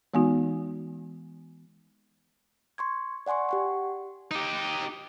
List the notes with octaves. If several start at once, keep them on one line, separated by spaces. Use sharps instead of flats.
E3 G#3 B3 D#4 F#4
C6 C#6 G#6
D5 F#5 G#5 C6 C#6
G4 F#5 C#6
D#4 G4